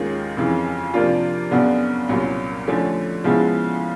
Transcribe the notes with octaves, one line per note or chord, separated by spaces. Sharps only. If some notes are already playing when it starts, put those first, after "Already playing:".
Already playing: D#2 D#3 G#3 C#4 F4
F2 C#3 E3
C3 F3 A#3 D4 F4
F#2 C#3 F#3 B3 D4
C2 A#2 F#3 A#3 C#4
D3 F3 A3 C#4
C#3 F3 G#3 B3 E4